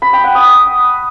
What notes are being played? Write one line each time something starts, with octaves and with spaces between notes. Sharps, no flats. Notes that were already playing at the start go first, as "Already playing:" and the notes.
B5
G5
F#5
D#6